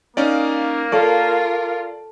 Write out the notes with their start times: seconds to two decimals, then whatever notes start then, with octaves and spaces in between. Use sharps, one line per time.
0.17 A#3 C#4 D#4 D5 F5
0.92 F4 A4 A#4 C#5 D5